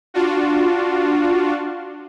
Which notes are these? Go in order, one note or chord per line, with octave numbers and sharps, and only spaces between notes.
D4 F4 F#4